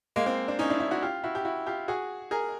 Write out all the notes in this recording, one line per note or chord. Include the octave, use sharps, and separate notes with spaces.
G#3 A#3
A#3 C4
C4 D4
C#4 D#4
D4 E4
D4 E4
E4 F#4
F4 G4
E4 F#4
G4
E4 F#4
F4 G4
F#4 G#4
G#4 A#4